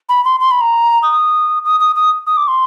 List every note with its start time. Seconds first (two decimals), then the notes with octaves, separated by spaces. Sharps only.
0.09 B5
0.25 C6
0.40 C6
0.51 B5
0.61 A#5
1.03 D#6
1.65 D#6
1.80 D#6
1.96 D#6
2.27 D#6
2.37 D6
2.48 C6